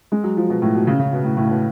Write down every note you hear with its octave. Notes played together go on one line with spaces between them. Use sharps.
G#3
F#3
F3
B2
A2
B2
C#3
C#3
B2
A2
A2
B2